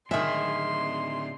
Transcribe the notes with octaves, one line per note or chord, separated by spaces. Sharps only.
A2 D3 D#3 G#3 E5 C6